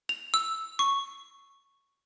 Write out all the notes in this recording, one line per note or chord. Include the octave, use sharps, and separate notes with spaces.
F7
E6
C#6